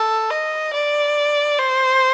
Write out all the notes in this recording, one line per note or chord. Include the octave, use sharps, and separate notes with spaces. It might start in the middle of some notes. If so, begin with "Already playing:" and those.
Already playing: A4
D#5
D5
C5